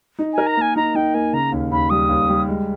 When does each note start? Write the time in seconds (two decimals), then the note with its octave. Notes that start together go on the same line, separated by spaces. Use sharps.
0.19 D#4
0.33 A#4 G#5
0.47 A#5
0.57 A#3 G#5
0.76 D#4 A#5
0.95 D#4 G5
1.14 A#3 G#5
1.33 C#3 A#5
1.52 D#2
1.71 D#2 B5
1.90 G3 D#6
2.09 D#2
2.29 G3
2.48 G#3